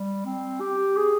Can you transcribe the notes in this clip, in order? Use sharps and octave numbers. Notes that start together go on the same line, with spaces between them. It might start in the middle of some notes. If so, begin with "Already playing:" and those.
Already playing: G3
C4
G4
G#4